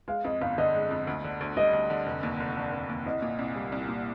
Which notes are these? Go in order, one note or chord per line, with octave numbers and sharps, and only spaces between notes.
G#3 F5
F2 D#5
G1 F5
D3 D#5
G#3
F2
D2
D3
D2
G3 D#5
D2
D3
F1
D#2
F1
D3
F1
D#2
C2 D#5
A#2
C2
G3
C2
A#2